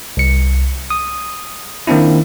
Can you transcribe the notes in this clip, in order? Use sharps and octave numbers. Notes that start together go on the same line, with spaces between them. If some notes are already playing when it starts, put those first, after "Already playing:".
C2 C#7
D#6
D#3 A#3 C4 D4 E4